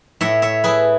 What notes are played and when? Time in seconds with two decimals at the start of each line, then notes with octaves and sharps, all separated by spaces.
0.21 A2 C#5 E5
0.42 C#5 E5
0.64 E4 G#4 B4